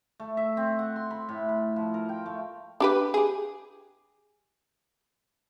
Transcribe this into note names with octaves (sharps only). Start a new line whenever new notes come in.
A3
E5
C4
F#5
C6
B5
A2
B5
F3
A#4
G5
A3
D4 G4 B4
G4 G#4